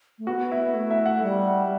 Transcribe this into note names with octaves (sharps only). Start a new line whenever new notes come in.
A3
B3 F#4
E4
A3
E5
F#5
G3